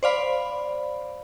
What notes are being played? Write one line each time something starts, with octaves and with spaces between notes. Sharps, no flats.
C5 D5 F5 B5